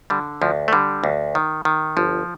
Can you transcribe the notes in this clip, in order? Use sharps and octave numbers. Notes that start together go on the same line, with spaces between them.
D3 G3
D2 F3
A3
D3 G3
D2
D#3
D#3
G1 F3